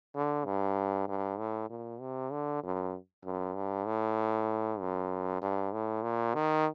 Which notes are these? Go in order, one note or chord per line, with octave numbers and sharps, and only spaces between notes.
D3
G2
G2
A2
A#2
C3
D3
F#2
F#2
G2
A2
F#2
G2
A2
A#2
D#3